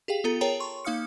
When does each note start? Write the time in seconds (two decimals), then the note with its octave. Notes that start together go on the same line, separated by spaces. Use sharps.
0.08 G4 G#4 F5 G5
0.24 B3 F4 A4 A#5
0.41 G#4 A#4 C#5 G5 A5 A#5
0.60 C6 C#6
0.85 A#3 D#4 F5 D#6 F6 C#7